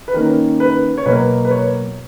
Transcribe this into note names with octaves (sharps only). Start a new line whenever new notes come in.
B4
D#3 A#3 C#4 A#4
B4
C#5
B2 F#3 A#3 B4
B4
C#5